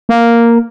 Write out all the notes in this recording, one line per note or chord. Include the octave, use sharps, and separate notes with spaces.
A#3